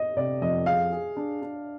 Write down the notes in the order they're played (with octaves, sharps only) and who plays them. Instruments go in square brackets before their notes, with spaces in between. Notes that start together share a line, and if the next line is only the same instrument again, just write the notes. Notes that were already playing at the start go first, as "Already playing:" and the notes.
Already playing: [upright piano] D#5
[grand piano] C3 [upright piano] D5
[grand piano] F2 [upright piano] D#5
[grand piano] G#4 [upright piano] F5
[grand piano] G#4
D4
D4